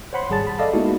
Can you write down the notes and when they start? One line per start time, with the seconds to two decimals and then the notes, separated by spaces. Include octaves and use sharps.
0.13 C5 C#5 F#5 B5 C6
0.30 G#1 G3 G#4 A5 A6
0.47 B5
0.59 A4 D5 D#5 F5 A5
0.73 G#3 A#3 B3 D#4 E4 F#4